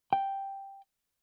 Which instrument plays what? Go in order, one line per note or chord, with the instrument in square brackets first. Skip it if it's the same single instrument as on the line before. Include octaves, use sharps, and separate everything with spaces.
[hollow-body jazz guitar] G5